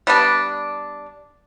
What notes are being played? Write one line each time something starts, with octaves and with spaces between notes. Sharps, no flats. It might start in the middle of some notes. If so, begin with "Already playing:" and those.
G3 B3 D4